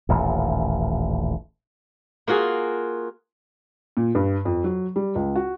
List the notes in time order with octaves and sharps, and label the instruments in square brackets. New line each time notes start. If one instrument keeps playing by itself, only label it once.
[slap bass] D#1 A1 D#2
[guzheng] A#3 F4 F#4 G#4
[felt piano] A#2
G2
F2
F#3
G3
C#2
F#4